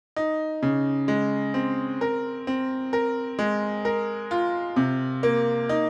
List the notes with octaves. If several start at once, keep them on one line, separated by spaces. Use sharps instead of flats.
D#4
C#3
G#3
C4
A#4
C4
A#4
G#3
A#4
F4
C3
A#3
D#4